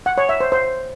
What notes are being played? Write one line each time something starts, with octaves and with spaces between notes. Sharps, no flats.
F#5
C#5
E5
C5
C5